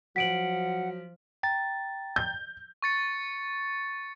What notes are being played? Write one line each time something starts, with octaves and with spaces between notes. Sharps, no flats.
F3 F#3 F#5 B6 D7 F#7
G5 A#5 A6
G6
C#6 A6 C#7